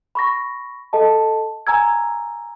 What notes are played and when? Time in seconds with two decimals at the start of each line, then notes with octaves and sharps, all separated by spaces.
0.15 B5 C#6 A#6
0.93 A4 D#5 A5
1.67 G#5 A#5 E6 G#6